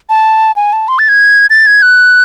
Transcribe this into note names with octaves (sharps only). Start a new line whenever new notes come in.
A5
G#5
A5
C6
A6
G#6
A6
G#6
F#6